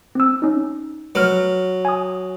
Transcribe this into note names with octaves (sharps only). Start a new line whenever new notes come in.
C4 E6
C#4 D#4
F#3 B4 F6
G#5 D#6